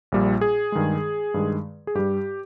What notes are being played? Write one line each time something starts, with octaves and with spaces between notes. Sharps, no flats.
A#1 A#2 G3
G#4
G2 D#3 G#3
G2 D#3 G#3
G#4
G2 G3 G4